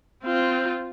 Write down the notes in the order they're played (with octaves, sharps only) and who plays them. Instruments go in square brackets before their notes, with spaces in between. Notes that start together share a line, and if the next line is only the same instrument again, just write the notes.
[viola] C4 F4